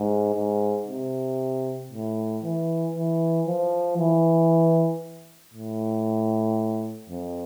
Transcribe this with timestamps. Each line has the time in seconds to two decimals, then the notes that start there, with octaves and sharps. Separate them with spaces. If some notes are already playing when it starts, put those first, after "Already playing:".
Already playing: G#2
0.35 G#2
0.87 C3
1.91 A2
2.43 E3
2.95 E3
3.47 F3
3.98 E3
5.54 A2
7.09 F2